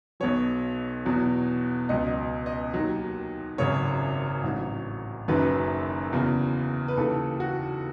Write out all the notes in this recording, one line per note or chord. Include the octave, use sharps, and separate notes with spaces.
B1 B2 F#3 C#5
E2 B2 F#3
C#2 B2 F#3 D#5
D#5
D#5
D#2 D#3 F#3
G#1 F#2 C#3 C#5
A1 G#2 F#3
F#1 F#2 D#3 F#3 B4
E2 C#3 F#3
B4
D#2 C#3 E3 A4
F#4